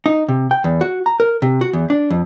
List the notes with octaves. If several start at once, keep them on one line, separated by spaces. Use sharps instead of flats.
D#4
C3
G5
E2
F#4
A#5
A#4
C3
F#4
E2
D4
F2